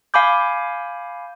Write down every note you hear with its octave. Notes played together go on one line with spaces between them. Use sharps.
F5 G#5 B5 D6 G6